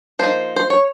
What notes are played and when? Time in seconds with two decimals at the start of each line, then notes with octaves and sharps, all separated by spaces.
0.19 F3 A#3 D#4 C5
0.56 C5
0.70 C#5